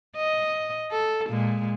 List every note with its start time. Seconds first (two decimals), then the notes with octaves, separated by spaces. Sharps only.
0.16 D#5
0.91 A4
1.29 A#2 G#3